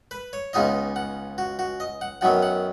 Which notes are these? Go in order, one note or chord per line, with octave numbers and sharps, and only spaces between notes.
B4
C#5
C#2 C#3 G#3 B3 D#4 D#5
F#5
F#4
F#4
D#5
F#5
F#2 D#3 F#3 B3 F#5
F#5